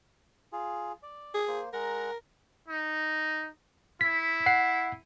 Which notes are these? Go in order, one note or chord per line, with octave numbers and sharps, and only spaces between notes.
F4 G#4
D5
G#4
A#3 C5
G#3 A#4 F#5 A#5
D#4
E4 B6
F#5 C7